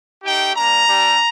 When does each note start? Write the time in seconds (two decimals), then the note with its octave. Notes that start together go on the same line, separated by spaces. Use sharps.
0.24 A3 D#4 G4 G5
0.56 G3 A#3 D4 A#5
0.88 G3 D4 G4